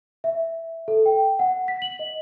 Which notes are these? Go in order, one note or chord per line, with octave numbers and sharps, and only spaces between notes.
E5
A4
G5
F#5
B6
F#7
D#5